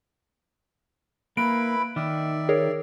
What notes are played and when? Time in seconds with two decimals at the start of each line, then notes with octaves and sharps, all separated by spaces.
1.37 A#3 E4 B4 B5 D7
1.96 D#3 D5 E5
2.49 G#4 A#4 C#5